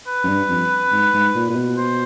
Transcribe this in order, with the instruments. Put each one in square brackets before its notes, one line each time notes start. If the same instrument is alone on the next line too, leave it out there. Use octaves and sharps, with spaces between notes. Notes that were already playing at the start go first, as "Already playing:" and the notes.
[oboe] B4
[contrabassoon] F#2
G2
F2
G#2
G#2
A#2
A#2
B2
[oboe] C5